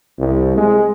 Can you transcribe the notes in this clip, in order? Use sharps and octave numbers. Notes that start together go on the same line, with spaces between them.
C2
G#3